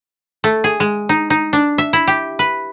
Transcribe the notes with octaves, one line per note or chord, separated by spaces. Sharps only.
A3
G#4
G#3
D#4
D#4
D4
E5
E4
G4
B4